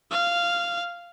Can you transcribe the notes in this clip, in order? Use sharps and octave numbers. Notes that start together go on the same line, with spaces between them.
F5